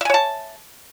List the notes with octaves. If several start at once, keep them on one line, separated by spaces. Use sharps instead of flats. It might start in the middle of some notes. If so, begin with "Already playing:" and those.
C#5 E5 G#5 A5